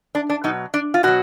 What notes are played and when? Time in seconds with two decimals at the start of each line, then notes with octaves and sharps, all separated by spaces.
0.15 D4
0.30 D4
0.44 B2 F#3 D#4
0.74 D4
0.94 F4
1.03 B2 F#3 F#4